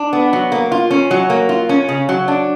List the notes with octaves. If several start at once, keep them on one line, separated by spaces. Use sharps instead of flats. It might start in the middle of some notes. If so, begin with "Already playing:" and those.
Already playing: D4
B3
F#3
A#3
F4
C#4
F#3
A#3
F4
C#4
C#3
F#3
D4